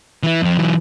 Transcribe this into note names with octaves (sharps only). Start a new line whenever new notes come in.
E3 E4
F2 F3
E3 F#3